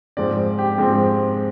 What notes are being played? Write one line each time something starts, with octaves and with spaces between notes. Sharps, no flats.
G#2 F3 G#3 C4 D5
G4
G#2 F3 G#3 C4